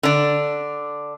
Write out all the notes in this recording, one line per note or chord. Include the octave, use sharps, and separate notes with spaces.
D3 D4